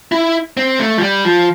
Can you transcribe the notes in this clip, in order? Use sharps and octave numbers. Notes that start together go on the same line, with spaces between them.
E4
C4
A3
F3
G3
F3